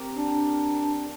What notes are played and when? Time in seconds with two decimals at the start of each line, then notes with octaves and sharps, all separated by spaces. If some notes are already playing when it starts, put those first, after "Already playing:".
Already playing: C4 G4 A#4
0.16 D4